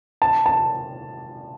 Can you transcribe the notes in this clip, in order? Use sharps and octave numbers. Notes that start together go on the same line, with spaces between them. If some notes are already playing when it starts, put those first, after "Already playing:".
A5
A5